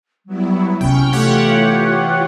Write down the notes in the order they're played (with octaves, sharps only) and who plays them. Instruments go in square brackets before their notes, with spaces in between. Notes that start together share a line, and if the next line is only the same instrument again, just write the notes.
[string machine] F#3 B3 E4 [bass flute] G3
[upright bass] C3 B3 [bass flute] C#4 [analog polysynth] G5 [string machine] C#6 F6
[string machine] E3 F4 [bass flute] A3 [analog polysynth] G4 C#5 F#5